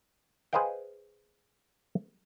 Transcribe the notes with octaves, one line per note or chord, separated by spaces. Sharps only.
G#4 B4 C5 D#5 F5 G5